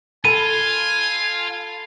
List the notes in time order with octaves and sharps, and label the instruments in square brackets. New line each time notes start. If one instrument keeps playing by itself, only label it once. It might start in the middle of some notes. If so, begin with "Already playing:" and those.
[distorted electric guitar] F4 [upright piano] A4 B5 [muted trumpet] G#5 [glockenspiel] D#7